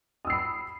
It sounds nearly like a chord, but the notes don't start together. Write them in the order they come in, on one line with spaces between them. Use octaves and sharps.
D#6 E6 C7 B5